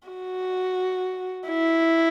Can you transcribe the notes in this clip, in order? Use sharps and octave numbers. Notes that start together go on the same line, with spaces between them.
F#4
E4